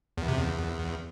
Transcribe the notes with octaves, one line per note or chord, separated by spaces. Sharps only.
E2
C3
E2